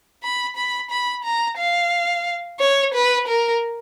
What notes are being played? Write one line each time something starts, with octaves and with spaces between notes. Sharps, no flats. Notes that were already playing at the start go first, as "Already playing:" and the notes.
B5
B5
B5
A#5
F5
C#5
B4
A#4